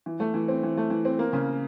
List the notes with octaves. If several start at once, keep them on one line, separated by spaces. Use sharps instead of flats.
E3
A3
E3
C4
E3
A3
E3
C4
A#3
C#3